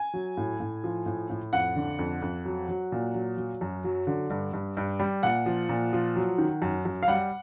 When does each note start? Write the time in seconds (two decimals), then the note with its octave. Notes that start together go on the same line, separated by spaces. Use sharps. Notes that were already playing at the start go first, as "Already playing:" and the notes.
Already playing: G#5
0.14 F#3
0.37 A2
0.60 A2
0.84 F3
1.06 A2
1.30 A2
1.53 F2 F#5
1.76 D3
1.99 F2
2.22 F2
2.45 F#3
2.68 F#3
2.92 A#2
3.14 F#3
3.37 F#3
3.61 F#2
3.84 F#3
4.07 D3
4.30 G2
4.53 G2
4.77 G2
5.00 G3
5.23 A#2 F#5
5.46 F3
5.69 A#2
5.93 F3
6.16 F#3
6.38 D#3
6.62 F#2
6.85 F#2
7.03 F5
7.08 G3 F#5